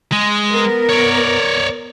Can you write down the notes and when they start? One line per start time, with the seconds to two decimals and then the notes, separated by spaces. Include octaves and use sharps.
0.13 G#3
0.49 B3 A#4
0.90 C#5 D5